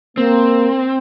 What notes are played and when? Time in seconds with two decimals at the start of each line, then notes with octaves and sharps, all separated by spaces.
0.17 A#3 C4